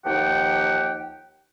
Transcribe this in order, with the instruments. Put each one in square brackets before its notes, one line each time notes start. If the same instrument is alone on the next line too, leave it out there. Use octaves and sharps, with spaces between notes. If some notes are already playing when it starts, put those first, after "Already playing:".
[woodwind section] D#2 F3 G4 F#5 G5